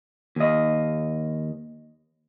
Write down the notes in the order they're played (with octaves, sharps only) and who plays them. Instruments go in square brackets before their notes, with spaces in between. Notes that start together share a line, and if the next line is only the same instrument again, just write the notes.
[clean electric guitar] D#2 D#5